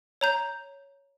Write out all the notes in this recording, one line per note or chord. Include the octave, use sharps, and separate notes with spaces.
C#5 A#5 G6